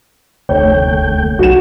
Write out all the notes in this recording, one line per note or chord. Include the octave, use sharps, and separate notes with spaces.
F1 D2 A3 C#5 G5
B1 F#4 E7